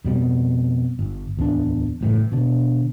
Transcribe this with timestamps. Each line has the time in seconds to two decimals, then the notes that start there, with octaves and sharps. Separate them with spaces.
0.05 F2 B2 G3
0.99 G1
1.37 D1 E2 E3 D4
2.01 F#1 A2 E3
2.32 B2 D3 D4